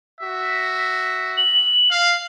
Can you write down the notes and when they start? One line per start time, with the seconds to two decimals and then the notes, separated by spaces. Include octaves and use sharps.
0.21 F#4 E5
1.37 F#7
1.91 F5